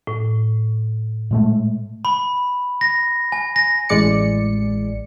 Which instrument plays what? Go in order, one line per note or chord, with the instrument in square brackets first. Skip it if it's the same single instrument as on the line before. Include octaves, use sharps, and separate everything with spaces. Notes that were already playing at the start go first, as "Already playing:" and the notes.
[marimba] A2
[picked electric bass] A#2 G#3 A3
[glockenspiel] B5
A#6
G#5
A#6
[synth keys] A1 G#3 D5 C#7